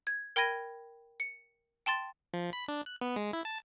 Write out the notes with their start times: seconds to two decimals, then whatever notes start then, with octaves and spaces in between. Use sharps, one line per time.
0.07 G#6
0.36 A#4 G5 B5 G#6 A#6 D#7
1.20 C#7
1.86 G5 A5 C6 A6
2.34 F3
2.53 B5
2.68 D4
2.86 F#6
3.01 B3
3.16 G#3
3.33 E4
3.45 A5